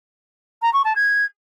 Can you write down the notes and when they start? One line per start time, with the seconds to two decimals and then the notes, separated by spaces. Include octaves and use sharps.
0.62 A#5
0.73 C#6
0.85 A5
0.96 G#6